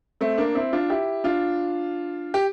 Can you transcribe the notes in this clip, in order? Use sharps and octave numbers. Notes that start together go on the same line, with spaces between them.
A3 C4
A#3 D4
C4 E4
D4 F4
E4 G4
D4 F4
G4